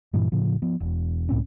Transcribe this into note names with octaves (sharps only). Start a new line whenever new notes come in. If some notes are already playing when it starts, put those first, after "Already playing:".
G2 A#2 E3
A2 C#3 F3
F3 B3
E1
C#2 A2 C4 C#4